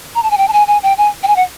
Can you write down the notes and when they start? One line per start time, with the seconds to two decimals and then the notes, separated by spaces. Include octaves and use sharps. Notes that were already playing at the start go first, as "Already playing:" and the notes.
0.15 A#5
0.23 A5
0.31 G#5
0.38 G5
0.48 A5
0.53 G#5
0.68 G#5
0.83 G5
0.98 G#5
1.23 G5
1.28 G#5
1.36 F#5